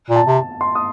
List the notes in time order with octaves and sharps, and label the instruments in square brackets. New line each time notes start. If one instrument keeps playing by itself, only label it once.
[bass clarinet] A#2
[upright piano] A5
[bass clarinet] C3
[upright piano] C6
D#6